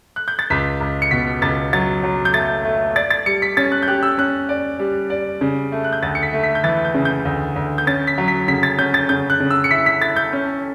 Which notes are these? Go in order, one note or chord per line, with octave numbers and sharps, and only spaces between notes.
F#6
G6
A6
C#2 B6
C#2
C#7
B2 B6
C#2 A6
F#3 A6
F#3
G6
A3 A6
A3
D5 A6
A6
G3 C#7
B6
C#4 A6
F#6
G6
G4 F#6
E6
C#4 F#6
D5
G3
D5
C#3
A3
F#6
G6
D2 A6
C#7
B6
A3
B6
G6
E3 A6
G6
C#3
G6
D2
D2
G6
C#4 A6
B6
F#3
B6
C#3 B6
A6
C#4 G6
A6
C#3 G6
F#6
C#3
E6
C#7
E4 B6
B6
E4 A6
G6
C#4